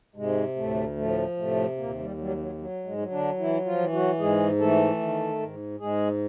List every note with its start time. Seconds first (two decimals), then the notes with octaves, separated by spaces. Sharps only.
0.16 G#2 C3 G#3
0.56 D2 A2 A3
0.96 A2 F3 A3
1.37 A2 C3 A3
1.77 D#2 A#2 A#3
1.98 G3
2.17 F#3 G3
2.37 F#3
2.58 F#3
2.85 G#2 G#3
2.98 F#3
3.11 D3 D4
3.39 E3 E4
3.65 F3 F4
3.79 E3
3.92 F#3 F#4
4.19 G#2 G#3 G#4
4.59 E3 A3 A4
5.00 D#3
5.40 G#2
5.80 G#2 G#3 G#4